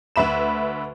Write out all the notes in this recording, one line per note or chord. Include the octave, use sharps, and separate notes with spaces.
D2 B4 E5 B5 E7